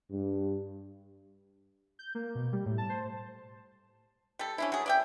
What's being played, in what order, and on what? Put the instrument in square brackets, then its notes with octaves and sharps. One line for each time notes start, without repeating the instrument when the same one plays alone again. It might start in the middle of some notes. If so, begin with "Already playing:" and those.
[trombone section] G2
[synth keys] G6
A#3
B2
G3
A2
A5
C5
[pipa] G3 A4
C#4 D4 E4
F#3 G#4
D5 E5 G5